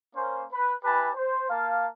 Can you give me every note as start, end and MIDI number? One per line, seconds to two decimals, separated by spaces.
0.16 0.44 58
0.16 0.44 61
0.16 0.44 72
0.52 0.74 71
0.84 1.10 64
0.84 1.10 67
0.84 1.10 71
0.84 1.10 80
0.84 1.10 81
0.84 1.10 83
1.15 1.45 72
1.50 1.87 58
1.50 1.87 77
1.50 1.87 81